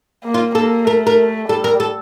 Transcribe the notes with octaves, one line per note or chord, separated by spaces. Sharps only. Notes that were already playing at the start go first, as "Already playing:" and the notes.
A#3
F4
A#3 A4
A3 A#4
A#4
G3 A4
A#4
A4